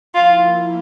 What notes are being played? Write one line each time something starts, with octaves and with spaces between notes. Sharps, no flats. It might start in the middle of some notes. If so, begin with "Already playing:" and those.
F3 A#3 E4 F4